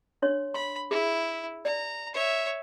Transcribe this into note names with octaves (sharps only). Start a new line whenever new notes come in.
D4 C#5 C6
B5 C6
E4 G#4
D5 A#5
C#5 E5